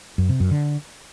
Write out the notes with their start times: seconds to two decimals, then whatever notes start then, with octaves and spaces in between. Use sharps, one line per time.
0.18 F#2
0.29 C3
0.40 F#2
0.51 D3